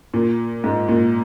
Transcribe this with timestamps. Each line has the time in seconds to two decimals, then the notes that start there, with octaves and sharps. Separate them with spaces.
0.14 A#2
0.64 G#2
0.89 A#2